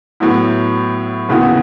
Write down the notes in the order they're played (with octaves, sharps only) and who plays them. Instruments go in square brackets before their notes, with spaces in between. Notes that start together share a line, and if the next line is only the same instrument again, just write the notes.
[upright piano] A2 F#3 B3 E4
D#2 C#3 E3 B3 F#4